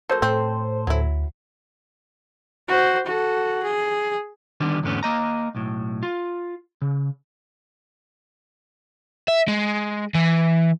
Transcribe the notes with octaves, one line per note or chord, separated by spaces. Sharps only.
F#3 A#3 A4 C5
A2 C4
D2 F#3 E4
F#4 C5
F#4 A4
G#4
D3 D#3 G3 B3 D4
E2 G#2 D3 A3 B3 C#4
A#3 D#5 A#5
B1 A2
F4
C#3
E5
G#3
E3